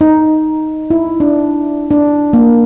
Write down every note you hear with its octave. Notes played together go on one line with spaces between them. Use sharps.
D#4
E4
D4
D4
A#3